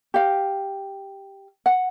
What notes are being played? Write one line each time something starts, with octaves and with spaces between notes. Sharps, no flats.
G4 F5
F#5